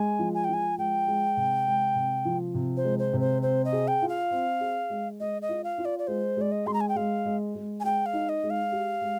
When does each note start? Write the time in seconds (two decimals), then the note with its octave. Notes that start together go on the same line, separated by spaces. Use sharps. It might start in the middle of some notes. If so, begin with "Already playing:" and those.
Already playing: G#3 G#5
0.19 F3
0.34 G#5
0.44 G5
0.49 F3 G#5
0.78 G#3 G5
1.07 G#3
1.37 C3
1.67 G#3
1.95 C3
2.25 F3
2.54 C3
2.77 C5
2.84 G#3
2.99 C5
3.13 C3
3.20 C5
3.42 C4 C5
3.65 D#5
3.73 G#4
3.88 G5
4.02 F4
4.09 F5
4.31 C4
4.61 G#4
4.90 G#3
5.20 G#3 D#5
5.42 D#5
5.49 F4
5.64 F5
5.78 F4
5.85 D5
5.99 D5
6.07 G#3 C5
6.37 G#3 D5
6.52 D#5
6.66 G#3 C6
6.74 A#5
6.81 G#5
6.89 G5
6.96 G#3 F5
7.26 G#3
7.55 G#3
7.80 G#5
7.84 G#3 G5
8.06 F5
8.13 D#4
8.29 D#5
8.43 G#3
8.50 F5
8.72 G4
9.01 G#3